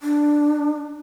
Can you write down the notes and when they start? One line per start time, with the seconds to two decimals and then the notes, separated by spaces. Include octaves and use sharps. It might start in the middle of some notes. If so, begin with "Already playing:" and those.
0.01 D4